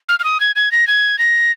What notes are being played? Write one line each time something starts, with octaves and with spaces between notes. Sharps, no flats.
F6
F6
D#6
G#6
G#6
A#6
G#6
A#6